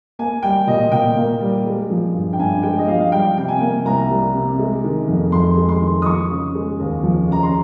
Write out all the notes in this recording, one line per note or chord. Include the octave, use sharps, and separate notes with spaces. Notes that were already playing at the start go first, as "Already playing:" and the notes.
A#3 G#5
G3 G5
A#2 D#5
A#2 G5
A#3
G3
G#3
F3
G2
G5
G2 G#5
G#3 G5
D#5
F3 F5
F5
G3 G5
C3 G5
G#5
A#3
C2 A#5
G3
C3
G#3
D#3
F2
F2 C6
G#3
C6
D#3
D#6
F3 C#6
C#3
G#3
D#2
F3
C#3 A#5
C6